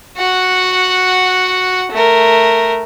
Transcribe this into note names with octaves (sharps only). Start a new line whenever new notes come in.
F#4 F#5
A3 A#4